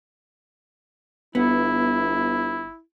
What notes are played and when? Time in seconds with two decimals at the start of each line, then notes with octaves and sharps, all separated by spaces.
1.35 G1 B3 E4